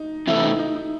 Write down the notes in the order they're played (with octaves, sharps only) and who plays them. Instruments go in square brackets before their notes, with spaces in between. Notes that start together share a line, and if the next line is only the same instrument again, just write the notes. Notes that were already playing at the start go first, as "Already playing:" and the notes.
Already playing: [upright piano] D#4
[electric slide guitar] C3 E3 A3 C#4 [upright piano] E4
[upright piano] D#4
D#4
D#4